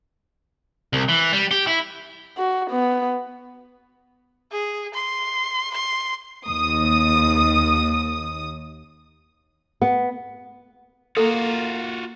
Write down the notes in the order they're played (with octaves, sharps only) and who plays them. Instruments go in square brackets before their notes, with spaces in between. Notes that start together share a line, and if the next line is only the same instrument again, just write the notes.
[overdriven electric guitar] C2
E3
G3
G4
E4
[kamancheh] F#4
B3
[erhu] G#4
C6
C6
[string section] D#2 D#6
[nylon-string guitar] B3
[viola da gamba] A#3 [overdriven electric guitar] F4 F#4 [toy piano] A4